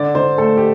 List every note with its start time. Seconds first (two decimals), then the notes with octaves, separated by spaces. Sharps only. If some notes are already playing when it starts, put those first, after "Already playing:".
Already playing: D3 D5
0.15 D3 C5
0.38 A3 A4
0.57 G4